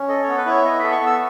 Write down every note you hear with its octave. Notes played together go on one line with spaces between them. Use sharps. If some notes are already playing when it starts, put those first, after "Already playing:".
Already playing: C#4
A4 D#5
B3 C#5
B4
E4 C#5
B3 D#5
A4 E5
C#6
B3
E6